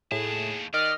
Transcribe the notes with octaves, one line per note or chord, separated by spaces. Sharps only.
D#2 A2 G#4 A5
D#3 D5 D#5 F6